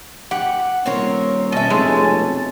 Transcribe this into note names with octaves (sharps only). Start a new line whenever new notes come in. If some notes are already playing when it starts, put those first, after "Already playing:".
G4 F#5
D#1 C4 A#4 C#5
B2 C#4 D#5 E5 G#5 A5
F1 G#3